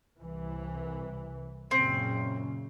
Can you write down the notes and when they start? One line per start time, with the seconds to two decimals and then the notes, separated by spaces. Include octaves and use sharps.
0.22 C2 E3
1.71 F#2 A#2 C#3 C4